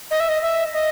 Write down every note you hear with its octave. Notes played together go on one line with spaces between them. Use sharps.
D#5
E5
D#5
E5
D#5